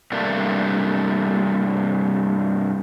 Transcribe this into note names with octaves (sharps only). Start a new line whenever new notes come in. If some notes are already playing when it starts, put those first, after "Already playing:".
G2 C3 A3 A#3 D4